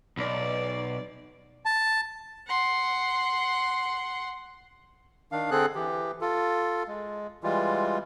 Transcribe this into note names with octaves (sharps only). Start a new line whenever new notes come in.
B1 D5
A5
F#5 C6
D#3 D4 F5
D3 C4 G#4 A4 F#6
E3 G4
F4 A4
G#3
E3 G3 G#3 F4